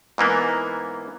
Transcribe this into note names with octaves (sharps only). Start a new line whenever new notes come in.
G#2 E3 A#3 B3